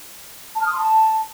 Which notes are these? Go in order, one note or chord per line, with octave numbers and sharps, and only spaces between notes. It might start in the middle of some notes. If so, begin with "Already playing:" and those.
A5
F6
D#6
C6
A5